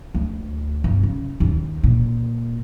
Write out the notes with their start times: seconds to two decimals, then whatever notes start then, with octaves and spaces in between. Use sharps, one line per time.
0.14 D2
0.84 G1
1.03 C#3
1.40 D#2
1.83 A#2